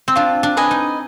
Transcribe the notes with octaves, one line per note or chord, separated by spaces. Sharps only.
C4
D4 F4
D4
B4 D#5 G#5
D#4